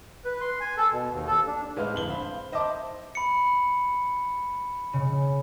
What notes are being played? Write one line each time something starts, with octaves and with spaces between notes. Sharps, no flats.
B4
C6
G#5
A4
B2
D#2
A4
D4
A2 G#3 B4 C5 F5 F6
F2 D3 F#7 G7
C5 F5 B5
C5 D#5 E5 A5 D6
B5 C#7
C#3